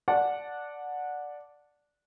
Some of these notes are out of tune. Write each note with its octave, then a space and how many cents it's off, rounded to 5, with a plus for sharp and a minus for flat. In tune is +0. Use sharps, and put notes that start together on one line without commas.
D5 +0 F#5 -15 A5 +0